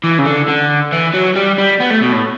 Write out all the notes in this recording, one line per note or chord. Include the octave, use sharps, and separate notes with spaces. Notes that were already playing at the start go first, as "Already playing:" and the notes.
E3
C#3
D3
D3
E3
F#3
G3
G3
B3
A3
B2
A2